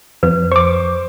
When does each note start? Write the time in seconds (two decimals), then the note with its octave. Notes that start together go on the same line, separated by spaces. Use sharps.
0.23 F2 B4
0.52 C5 C#6 D6